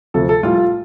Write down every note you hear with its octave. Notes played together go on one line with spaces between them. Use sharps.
D2 C3 F3 A4
A4
A#1 A2 G3 F4